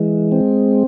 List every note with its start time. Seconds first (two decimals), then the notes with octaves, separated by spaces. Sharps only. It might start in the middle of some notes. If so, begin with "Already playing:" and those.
Already playing: E3 G#3
0.32 C4